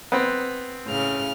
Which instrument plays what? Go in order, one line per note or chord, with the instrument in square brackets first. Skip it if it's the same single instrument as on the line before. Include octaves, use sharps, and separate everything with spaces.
[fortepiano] B3 C4
[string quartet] A2 C#3 F6